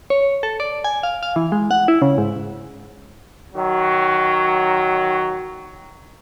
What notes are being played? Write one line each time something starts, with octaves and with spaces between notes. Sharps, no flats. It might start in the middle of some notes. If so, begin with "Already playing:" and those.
C#5
A4
D5
G#5
F5
F5
E3
G#3
F#5
E4
C#3
G#2
D#3 F#3